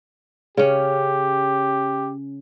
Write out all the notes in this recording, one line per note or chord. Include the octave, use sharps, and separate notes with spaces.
C#3 C#4 G4